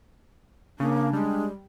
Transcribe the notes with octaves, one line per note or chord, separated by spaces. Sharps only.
C#3 A#3 D4
G3 G#3